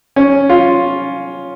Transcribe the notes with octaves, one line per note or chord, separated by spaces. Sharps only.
C#4
F4